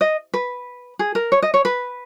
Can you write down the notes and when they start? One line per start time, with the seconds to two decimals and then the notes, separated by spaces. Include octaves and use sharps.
0.01 D#5
0.34 B4
0.99 G#4
1.15 A#4
1.32 C#5
1.42 D#5
1.54 C#5
1.65 B4